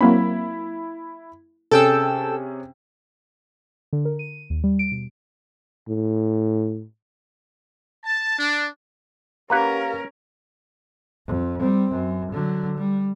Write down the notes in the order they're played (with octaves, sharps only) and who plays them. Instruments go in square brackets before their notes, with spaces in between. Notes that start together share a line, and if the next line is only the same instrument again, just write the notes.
[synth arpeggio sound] F#3 A#3 C4 [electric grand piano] E4 B5
[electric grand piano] C3 C#4 G#4 [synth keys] A4 G5 E6
[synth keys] D3
A#4
D#7
D#2
G3
D7
B2
[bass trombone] A2
[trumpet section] A5
D4
[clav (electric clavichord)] A#3 B4 F#5 [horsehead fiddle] C#4 A#4 [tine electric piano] G4 F5 A#5
[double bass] F2
G3 C4
F#2
D3 F#3
G3